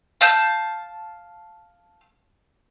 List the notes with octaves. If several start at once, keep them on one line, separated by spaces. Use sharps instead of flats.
F5 A5 G6